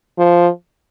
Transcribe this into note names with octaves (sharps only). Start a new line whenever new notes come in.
F3